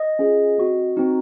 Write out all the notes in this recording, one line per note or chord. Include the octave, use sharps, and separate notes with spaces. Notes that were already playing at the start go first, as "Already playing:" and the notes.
Already playing: D#5
C#4 F4 G#4
C4 F#4
C4 D#4 F#4